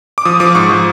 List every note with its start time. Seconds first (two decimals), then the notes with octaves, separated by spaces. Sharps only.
0.18 D6
0.25 F3 D#6
0.40 F3 D6
0.55 G#2 C#6
0.70 F3